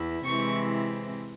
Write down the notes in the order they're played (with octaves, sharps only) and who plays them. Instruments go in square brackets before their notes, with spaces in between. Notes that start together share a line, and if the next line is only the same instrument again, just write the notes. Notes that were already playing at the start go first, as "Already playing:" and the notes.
Already playing: [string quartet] E2 E4
C3 E3 G#3 C4 E4 C#6